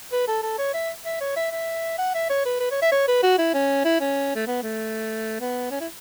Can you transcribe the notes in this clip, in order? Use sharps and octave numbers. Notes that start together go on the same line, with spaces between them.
B4
A4
A4
C#5
E5
E5
C#5
E5
E5
F#5
E5
C#5
B4
B4
C#5
E5
C#5
B4
F#4
E4
C#4
E4
C#4
A3
B3
A3
B3
C#4
E4